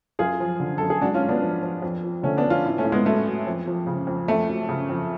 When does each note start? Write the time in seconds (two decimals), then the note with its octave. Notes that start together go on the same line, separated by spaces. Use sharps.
0.19 F#2 F4 G#4
0.40 F3
0.60 D3
0.78 F#2 A4
0.90 G#4
1.01 G#2 D4 F#4
1.14 C#4 F4
1.21 G#2
1.29 B3 D4
1.42 F3
1.63 F3
1.82 F2
2.04 F3
2.23 D3 A3 C#4
2.37 B3 D4
2.45 F2
2.50 C#4 F4
2.65 A2
2.78 A3 C#4
2.85 A2
2.92 G#3 B3
3.06 F#3 A3
3.26 F#3
3.47 F2
3.67 F3
3.87 C#3
4.07 F2
4.28 F2 A3
4.49 F#3
4.69 C#3
4.89 F2